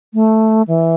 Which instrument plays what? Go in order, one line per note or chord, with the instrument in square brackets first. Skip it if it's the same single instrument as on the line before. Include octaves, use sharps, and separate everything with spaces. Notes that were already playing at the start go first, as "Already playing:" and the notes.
[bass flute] A3
E3